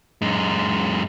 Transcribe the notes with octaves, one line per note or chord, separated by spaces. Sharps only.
F#2 G#3